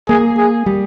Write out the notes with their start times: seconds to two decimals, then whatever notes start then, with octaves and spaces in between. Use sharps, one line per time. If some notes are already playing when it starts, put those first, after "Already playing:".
0.09 A#3 G#4
0.38 G#4
0.66 G3